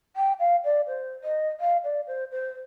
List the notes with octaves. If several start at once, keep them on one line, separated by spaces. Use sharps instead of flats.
G5
F5
D5
C5
D#5
F5
D5
C5
C5